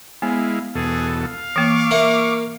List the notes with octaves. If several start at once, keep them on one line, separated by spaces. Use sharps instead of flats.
G#3 B3 E4 F5
E2 B2 G#4 A4
F5
E3 A#3 C#6 D6
A#3 E5